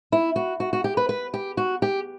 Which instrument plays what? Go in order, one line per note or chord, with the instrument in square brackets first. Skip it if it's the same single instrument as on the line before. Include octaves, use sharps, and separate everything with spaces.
[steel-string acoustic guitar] E4
F#4
F#4
F#4
G4
B4
B4
G4
F#4
G4